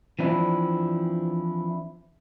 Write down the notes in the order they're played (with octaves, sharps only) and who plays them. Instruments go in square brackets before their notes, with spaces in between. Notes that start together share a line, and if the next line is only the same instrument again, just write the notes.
[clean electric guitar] E3 F3 C4 D4 E4